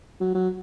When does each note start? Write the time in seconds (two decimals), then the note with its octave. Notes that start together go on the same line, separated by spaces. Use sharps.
0.20 F#3
0.35 F#3